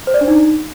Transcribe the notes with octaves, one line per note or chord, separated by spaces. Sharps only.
C5
D5
D4
D#4